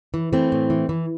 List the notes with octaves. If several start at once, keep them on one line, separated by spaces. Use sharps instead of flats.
E3
E3 A3 C4
A2
E3
E3